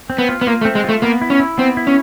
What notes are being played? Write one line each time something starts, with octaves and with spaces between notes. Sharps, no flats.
C4
B3
F4
B3
A#3 F4
A3
C4
G#3
A3 F4
A#3 B3
E4
C#4
E4
B3 C4
E4
C#4